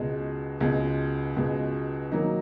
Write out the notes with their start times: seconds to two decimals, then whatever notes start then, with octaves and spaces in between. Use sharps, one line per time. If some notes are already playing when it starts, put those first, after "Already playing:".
Already playing: C#2 B2 G#3
0.61 C#2 B2 G#3
1.36 C#2 B2 G#3
2.12 D#3 F#3 A#3 D#4